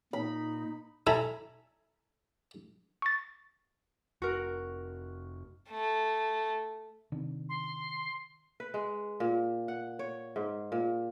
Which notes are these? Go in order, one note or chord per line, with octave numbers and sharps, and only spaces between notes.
A#2 D#4 B5
E4 A4 G#5 A#5 B5
C#6 A6
F1 F#4 A#4
A3
C3 D#3 D4
C6
B4
G#3
A#2
F#5
C#5
G#2
A#2